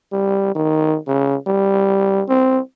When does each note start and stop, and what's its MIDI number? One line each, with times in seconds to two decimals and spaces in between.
0.12 0.55 55
0.55 0.98 51
1.07 1.36 49
1.47 2.23 55
2.29 2.59 60